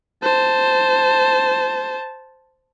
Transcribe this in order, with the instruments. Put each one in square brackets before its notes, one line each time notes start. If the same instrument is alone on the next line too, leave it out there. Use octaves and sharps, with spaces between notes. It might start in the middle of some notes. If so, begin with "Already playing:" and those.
[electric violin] C5 A5